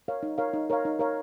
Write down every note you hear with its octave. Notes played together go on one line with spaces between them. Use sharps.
A#4 C#5 F5
D#4
A#4 C#5 F5
D#4
A#4 C#5 F5
D#4
A#4 C#5 F5